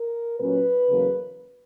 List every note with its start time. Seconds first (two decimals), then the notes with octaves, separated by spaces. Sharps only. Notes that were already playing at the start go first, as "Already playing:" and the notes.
Already playing: A#4
0.40 A#2 F#3 C#4 B4
0.89 E2 C#3 F#3 A#3